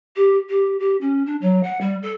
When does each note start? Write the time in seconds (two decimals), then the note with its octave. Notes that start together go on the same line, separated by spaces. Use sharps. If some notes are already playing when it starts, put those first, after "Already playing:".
0.16 G4
0.49 G4
0.80 G4
1.01 C#4
1.26 D4
1.41 F#3
1.63 F#5
1.81 G3
2.02 A4